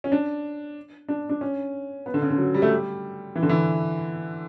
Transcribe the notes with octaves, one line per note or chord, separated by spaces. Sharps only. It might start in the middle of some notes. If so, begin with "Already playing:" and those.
C#4
D4
D4
D4
C#4
B3
D3
C#3
D3
F#3
G3
A3
G3
E3
D3
E3